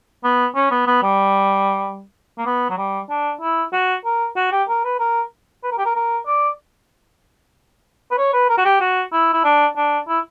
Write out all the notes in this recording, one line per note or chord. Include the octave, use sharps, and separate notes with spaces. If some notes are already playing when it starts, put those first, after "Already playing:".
B3
C#4
B3
B3
G3
A#3
B3
F#3
G3
D4
E4
F#4
A#4
F#4
G4
A#4
B4
A#4
B4
A#4
G4
A#4
A#4
D5
B4
C#5
B4
A#4
F#4
G4
F#4
E4
E4
D4
D4
E4